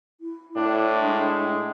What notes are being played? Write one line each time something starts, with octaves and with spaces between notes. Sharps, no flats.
E4
A2 D4
G#3 D4